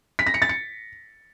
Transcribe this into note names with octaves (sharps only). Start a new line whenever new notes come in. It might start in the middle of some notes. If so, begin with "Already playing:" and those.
B6
A#6
C#7
A6
C#7